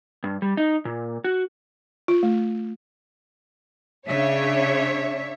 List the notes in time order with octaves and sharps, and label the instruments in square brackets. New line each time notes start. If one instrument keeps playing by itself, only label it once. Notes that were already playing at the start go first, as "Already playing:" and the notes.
[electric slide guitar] G2
G3
D#4
A#2
F#4
[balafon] F4
A3
[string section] C#3 [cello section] D4 E5 [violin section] C#5